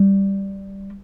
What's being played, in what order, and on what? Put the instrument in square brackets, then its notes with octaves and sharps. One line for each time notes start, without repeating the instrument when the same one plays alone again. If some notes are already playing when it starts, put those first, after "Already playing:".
Already playing: [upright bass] G3